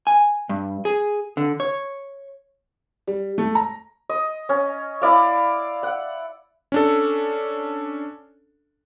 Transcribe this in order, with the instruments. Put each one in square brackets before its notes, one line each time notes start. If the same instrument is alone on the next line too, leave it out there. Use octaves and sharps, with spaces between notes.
[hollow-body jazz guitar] G#5
G2
G#4
D3
C#5
[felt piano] G3
A3
A#5
[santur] D#5
C#4
E4 D5 F5
F#5
[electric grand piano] C#4 D4 A4